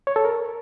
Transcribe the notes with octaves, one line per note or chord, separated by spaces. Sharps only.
C#5
A4
A#4